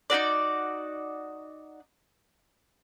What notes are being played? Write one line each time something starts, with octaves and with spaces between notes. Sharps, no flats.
D#4 E4 F#4 D5